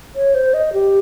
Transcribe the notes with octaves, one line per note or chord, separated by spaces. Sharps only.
C#5
C5
D#5
G4